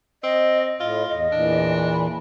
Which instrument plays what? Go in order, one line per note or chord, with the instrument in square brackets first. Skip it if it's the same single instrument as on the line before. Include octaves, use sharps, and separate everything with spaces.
[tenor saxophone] C4 [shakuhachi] D#5
[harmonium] A2 [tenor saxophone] F4 [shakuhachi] D#5
[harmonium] E2 [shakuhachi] D#5
[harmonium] E2 A#2 E3 [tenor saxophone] D4
[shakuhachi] B5